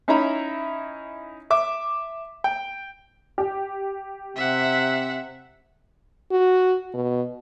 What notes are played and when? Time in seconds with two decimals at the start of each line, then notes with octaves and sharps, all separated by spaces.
0.08 C#4 D#4 E4 E5 A#5 B5
1.50 E5 D6
2.44 G5
3.38 G4
4.37 C3 E5 F#5
6.31 F#4
6.94 B2